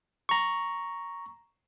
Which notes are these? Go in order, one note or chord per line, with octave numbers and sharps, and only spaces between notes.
A#5 C#6